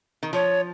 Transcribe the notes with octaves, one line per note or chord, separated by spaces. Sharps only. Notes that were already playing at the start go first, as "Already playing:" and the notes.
D#3
F3 C#5